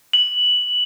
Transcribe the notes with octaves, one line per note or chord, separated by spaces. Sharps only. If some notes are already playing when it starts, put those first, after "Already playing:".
F#7